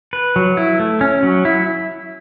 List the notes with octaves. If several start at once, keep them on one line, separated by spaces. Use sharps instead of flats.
B4
F#3
E4
A3
C#4
F#3
E4